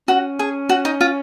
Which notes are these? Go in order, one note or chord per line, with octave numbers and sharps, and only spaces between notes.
C#4 F#4
G#4
F#4
D#4
F4